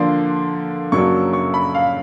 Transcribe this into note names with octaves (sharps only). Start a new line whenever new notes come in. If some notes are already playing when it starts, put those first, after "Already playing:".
Already playing: D3 F3 A#3 D4 C6
F#2 C#3 F#3 A#3 D4 C#6
C#6
B5
F5